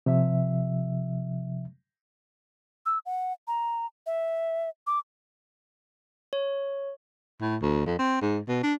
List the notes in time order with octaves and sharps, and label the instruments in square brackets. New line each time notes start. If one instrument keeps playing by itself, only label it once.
[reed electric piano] C3 F3 E5
[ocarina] E6
F#5
A#5
E5
D6
[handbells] C#5
[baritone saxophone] A2
D2
F2
C4
G#2
B2
D4